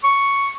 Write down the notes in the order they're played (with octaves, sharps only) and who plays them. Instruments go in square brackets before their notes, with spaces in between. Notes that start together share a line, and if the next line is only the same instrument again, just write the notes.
[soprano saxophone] C#6